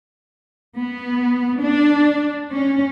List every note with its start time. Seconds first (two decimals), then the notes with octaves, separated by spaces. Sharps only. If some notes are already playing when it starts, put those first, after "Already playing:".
0.78 B3
1.62 D4
2.52 C#4